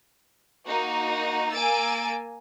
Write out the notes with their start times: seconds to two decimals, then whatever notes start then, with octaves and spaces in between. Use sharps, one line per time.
0.65 A#3 D#4 F#4
1.54 A#3 G#5 E6 A6 D7